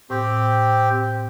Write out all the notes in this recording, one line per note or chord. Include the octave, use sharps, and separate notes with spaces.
A2 C4 G4